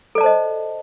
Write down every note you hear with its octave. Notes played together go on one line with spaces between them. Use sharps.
A4 C5 D5 D#5 A5